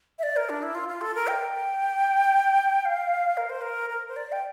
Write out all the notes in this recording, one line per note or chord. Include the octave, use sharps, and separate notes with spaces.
E5
D5
A#4
D4
E4
F4
F4
A4
A#4
G5
F5
A#4
C5
A#4
A#4
C5
D5
G5